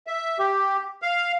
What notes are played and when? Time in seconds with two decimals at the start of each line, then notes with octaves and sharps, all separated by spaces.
0.07 E5
0.39 G4
1.02 F5